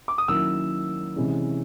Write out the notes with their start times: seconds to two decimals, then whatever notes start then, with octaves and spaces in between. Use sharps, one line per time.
0.08 D6
0.18 D#6
0.28 D#3 F#3 A#3 C#4 E4 E6
1.16 C3 E3 G#3 C#4 E4